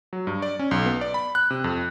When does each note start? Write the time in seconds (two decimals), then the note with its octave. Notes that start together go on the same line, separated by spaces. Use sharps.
0.13 F#3
0.27 G2
0.42 D5
0.59 C#4
0.71 B1
0.86 B3
1.01 D5
1.14 B5
1.35 F#6
1.50 C3
1.64 F2